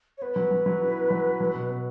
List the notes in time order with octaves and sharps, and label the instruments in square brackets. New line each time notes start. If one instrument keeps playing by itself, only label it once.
[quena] C#5
[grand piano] B3 [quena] B4
[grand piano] F#3
F#3
F#3
E4
B3
F#3
B3
F#3
B2
B2